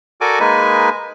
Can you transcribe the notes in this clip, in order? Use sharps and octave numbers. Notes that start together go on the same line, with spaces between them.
F#4 A4 A#4 D5 G#5 D6
G#3 A#3 D#4 B4 G#5